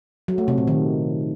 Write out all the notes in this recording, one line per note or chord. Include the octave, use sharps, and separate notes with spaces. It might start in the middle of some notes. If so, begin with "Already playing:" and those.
F#3
A3
C3
A#2
D#3